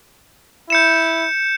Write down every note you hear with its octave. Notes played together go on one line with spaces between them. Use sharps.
E4 G6 C#7 E7